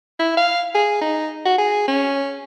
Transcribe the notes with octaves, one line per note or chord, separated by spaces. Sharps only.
E4
F5
G#4
D#4
F#4
G#4
C#4